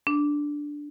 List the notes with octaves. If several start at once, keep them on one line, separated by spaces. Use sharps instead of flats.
D4